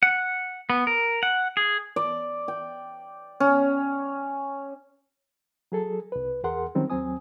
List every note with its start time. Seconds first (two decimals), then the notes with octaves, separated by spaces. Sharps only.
0.03 F#5
0.70 B3
0.87 A#4
1.23 F#5
1.57 G#4
1.96 D5
2.48 G5
3.40 C#4
5.72 F#3 G#4 A4
6.12 C2 B4
6.43 E2 G#4 A#4 F#5 C6
6.75 D#3 F#3 G3 C4 C#4 D#4
6.90 D#2 F#3 C4 G#5 D#6